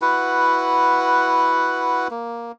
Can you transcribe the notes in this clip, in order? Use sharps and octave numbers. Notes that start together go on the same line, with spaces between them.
E4 F#4 B4 F#5
A#3